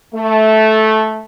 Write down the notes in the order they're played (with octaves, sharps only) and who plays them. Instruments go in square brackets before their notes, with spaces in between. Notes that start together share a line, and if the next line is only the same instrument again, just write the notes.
[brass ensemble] A3